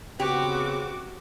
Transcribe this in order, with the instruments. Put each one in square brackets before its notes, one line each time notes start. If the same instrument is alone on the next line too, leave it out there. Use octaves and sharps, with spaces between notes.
[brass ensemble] C#3 B3 C4 [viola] F#4 D6 [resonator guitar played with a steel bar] G4